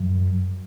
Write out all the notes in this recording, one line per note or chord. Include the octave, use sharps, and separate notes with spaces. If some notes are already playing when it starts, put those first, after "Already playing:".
Already playing: F#2